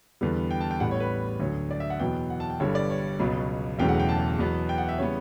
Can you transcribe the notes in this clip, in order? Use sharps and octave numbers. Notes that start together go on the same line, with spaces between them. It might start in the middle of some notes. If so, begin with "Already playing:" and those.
E2 D3 G3 B3
G5
A5
G5
A1 A2 G3 B3 F#5
C#5
B4
D2 D3 F#3 C#5
D5
E5
F#5
E2 B2 F#3 B3 G5
F#5
A5
G5
G1 G2 D3 G3 C#5
D5
C#5
C#2 B2 F#3 B3
E1 E2 C#3 F#3 A3 G5
F#5
G5
A5
E2 B2 F#3 B3
G5
F#5
E5
C#3 E3 G3 B3 C#5